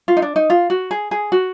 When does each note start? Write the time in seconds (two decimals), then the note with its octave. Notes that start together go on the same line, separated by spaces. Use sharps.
0.08 F4
0.17 D#4
0.22 D4
0.36 D#4
0.50 F4
0.70 F#4
0.91 G#4
1.11 G#4
1.32 F#4